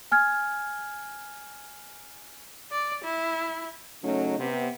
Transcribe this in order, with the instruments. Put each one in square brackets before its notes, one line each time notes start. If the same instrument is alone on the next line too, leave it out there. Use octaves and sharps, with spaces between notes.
[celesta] G#5 F6 G#6
[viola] D5
E4
[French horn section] C#3 F#3 A3 C#4 D#4
C3 B3